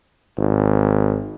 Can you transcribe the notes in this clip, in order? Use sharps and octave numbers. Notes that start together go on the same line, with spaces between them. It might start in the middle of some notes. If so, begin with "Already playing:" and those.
G#1